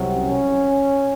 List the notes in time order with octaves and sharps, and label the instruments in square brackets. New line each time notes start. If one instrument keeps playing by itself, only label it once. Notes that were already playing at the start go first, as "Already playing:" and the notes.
Already playing: [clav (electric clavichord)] C2 C3 F#3
[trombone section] C#4